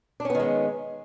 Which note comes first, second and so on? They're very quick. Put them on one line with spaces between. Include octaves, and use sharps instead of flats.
D4 C#4 B3 D#3 G#3